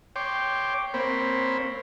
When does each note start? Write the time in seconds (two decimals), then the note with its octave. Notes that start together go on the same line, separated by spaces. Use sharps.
0.16 C#5 G5 C6 D6
0.94 A#3 C4 C5 C#5 B5